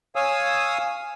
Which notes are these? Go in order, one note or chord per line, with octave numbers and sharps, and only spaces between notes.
C#5 F5 G#5 D#6 E6